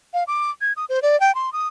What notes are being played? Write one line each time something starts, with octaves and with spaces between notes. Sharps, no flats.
F5
D6
G#6
D#6
C5
D5
G5
C6
D#6